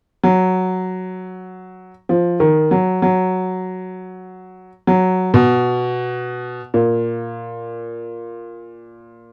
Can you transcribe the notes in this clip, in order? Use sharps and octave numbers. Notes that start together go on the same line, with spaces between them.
F#3
F3
D#3
F#3
F#3
F#3
B2
A#2